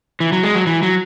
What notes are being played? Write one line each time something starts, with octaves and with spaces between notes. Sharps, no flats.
E3
F#3
G#3
F#3
E3
F#3